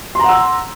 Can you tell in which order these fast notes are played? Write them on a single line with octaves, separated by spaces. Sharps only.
C6 A#5 F#5 E6